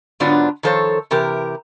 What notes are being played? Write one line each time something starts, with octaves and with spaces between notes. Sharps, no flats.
G#2 D3 F#3 B3 D4 F4
D#3 F3 A4 C5 C#5
C3 E3 G4 A#4